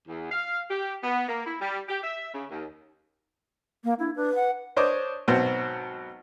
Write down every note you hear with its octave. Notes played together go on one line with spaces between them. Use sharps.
E2
F5
G4
B3
A#3
E4
G3
G4
E5
C#3
D#2
A#3
D4 E4
D4 B4
F#5
D4 C5 C#5 D#5 D6
G#1 B2 F#3 B3 C4 C5